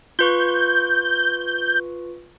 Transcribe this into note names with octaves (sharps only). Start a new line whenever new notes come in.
F4 B4 C#6 G6